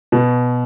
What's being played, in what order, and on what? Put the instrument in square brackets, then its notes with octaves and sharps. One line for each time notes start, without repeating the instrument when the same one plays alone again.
[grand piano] B2